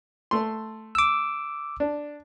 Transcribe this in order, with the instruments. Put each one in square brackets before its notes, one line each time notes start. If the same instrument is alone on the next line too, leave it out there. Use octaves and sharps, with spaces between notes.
[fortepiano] A3 C6
[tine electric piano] D6 E6
[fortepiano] D4